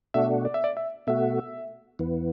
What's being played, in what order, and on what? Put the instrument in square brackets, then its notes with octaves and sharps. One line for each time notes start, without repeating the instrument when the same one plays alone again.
[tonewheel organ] B2 A3 D4 F#4 [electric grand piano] E5
[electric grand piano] D5
E5
D5
E5
[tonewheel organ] B2 A3 F#4 [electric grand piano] E5
[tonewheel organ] E2 E3 B3